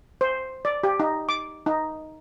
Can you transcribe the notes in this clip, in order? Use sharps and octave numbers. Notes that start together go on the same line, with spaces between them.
C5
D5
G4
D#4
D6
D#4